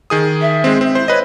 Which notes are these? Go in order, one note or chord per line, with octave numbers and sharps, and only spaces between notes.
D#3 G#4 D#6
E5
G#3 C4
C4
E4 C5
B4 C#5 D#5